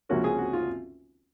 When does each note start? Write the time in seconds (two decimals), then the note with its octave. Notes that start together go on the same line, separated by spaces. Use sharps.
0.09 C#2 C3 F3 A#3 C#4 F#4
0.24 G#4
0.38 F#4
0.53 F4